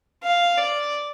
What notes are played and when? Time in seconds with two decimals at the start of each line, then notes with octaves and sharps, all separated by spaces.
0.23 F5
0.58 D5